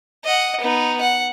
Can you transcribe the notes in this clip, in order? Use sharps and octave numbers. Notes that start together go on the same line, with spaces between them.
D#5 F#5
B3 D#4
F#5